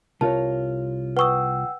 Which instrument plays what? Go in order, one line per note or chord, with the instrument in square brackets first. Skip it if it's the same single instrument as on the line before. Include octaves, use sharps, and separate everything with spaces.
[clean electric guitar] C2 F4 [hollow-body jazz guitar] A#4 C#5 [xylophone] A5
[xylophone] B4 C#6 D#6 [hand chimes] F#5 G5 E6